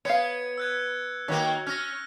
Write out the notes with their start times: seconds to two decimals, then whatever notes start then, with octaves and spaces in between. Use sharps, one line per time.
0.05 B3 C#5 F5 G#6 C#7
0.58 E6 F#6 G#6
1.28 D#3 A#3 F#4 C#5
1.67 C#4 F6 A#6